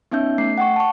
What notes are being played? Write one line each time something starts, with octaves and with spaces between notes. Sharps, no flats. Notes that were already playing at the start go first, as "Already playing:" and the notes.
B3 C#4 D#4 E5 G6
A3 C7
F#5 G5 C#6
A5 C#6